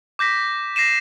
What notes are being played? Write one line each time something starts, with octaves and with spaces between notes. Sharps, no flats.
D6 G6 A#6 B6
A#6 C7 D#7 E7